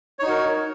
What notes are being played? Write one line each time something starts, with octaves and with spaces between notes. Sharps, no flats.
D#4 F#4 A#4 C#5